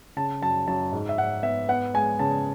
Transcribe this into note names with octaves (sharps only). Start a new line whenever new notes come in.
C#3 A5
F#2 A5
F#2 A5
G#2
E5
G#2 F#5
B3 E5
B3 F#5
G#3 G#5
C#3 A5